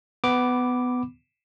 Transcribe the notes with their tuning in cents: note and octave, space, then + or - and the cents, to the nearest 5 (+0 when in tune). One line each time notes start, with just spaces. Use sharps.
B3 +15 B5 +0 D6 +0